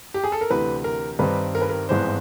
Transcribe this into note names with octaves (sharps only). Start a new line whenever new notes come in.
G4
G#4
A4
A#4
D2 C3 E3 B4
A#4
G2 D#3 G3 C4 D#4 B4
A#4
B4
A#4
G#1 G2 E3 G#3 B3 C5